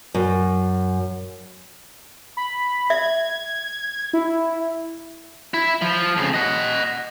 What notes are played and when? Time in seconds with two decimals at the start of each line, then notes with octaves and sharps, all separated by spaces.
0.15 F#2
2.37 B5
2.90 E5 G#6
4.13 E4
5.54 E4
5.82 F3
6.17 F2 C#3
6.34 D#5 F#5